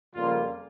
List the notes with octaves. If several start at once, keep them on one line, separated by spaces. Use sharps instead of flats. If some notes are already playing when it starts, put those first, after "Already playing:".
F2 C#3 G3 A#3 F4